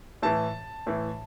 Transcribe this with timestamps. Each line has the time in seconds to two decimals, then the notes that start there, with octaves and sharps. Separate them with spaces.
0.22 A2 E3 A5
0.87 A2 E3